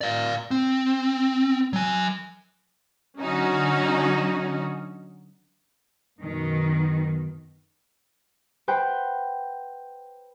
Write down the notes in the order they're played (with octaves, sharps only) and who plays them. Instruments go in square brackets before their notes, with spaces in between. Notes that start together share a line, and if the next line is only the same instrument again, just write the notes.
[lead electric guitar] D5 F5
C4
F#3 G#5
[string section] D3 F#3 C#4 D#4 F#4
[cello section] F#2 B2 D#3
[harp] B4 C5 F#5 G5